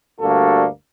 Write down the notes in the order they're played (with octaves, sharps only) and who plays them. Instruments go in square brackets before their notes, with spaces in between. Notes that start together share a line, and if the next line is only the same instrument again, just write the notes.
[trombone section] D2 G2 A#3 F#4 A4